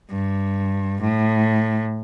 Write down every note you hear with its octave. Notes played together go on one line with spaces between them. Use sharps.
G2
A2